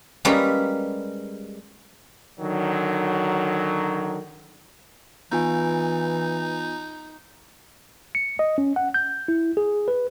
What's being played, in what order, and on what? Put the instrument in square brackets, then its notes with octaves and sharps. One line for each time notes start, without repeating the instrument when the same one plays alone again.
[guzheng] G3 G#3 A#3 C#4 G#4 B4
[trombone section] D3 D#3 F#3
[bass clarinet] E3 [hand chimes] B3 F4 G#5 [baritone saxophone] D#4
[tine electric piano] C#7
D#5
C#4
F#5
G6
E4
G#4
B4